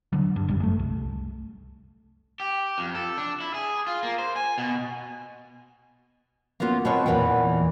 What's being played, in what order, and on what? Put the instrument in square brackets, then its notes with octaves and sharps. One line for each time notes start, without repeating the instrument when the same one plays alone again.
[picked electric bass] D3 F#3
G2
G#1 F#2 G3
G#3 A3
C2
[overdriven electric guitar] G4
F2
A4
D4
E4
G#4
F4
A#3
C5
G#5
B2
[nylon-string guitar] A#3 B3 C#4 F4 F#4
B2 C4 F4 F#4 C#5
E2 A#2 E3 B4 F#5 G5